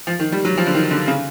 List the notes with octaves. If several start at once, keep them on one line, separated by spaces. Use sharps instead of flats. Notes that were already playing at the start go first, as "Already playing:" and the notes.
F3
D#3
G3
F#3
F3
D3
D#3
D3
C#3